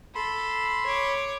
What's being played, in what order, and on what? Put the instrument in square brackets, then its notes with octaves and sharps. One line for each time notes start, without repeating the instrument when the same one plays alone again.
[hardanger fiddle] A4 [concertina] B5 C6
[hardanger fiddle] C#5 D6